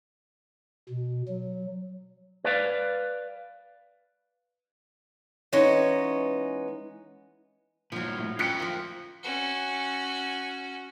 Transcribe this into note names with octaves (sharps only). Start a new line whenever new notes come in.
B2
F#3
B4 D5 F5
E3 G#3 B3 C#4 D#4
G2 A#2 F3 F#3
A2
F#2 F4 G5 F#6 B6 C#7
F3 A#3
C#4 F#4